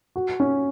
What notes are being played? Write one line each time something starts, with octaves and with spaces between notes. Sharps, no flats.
F#4
C#4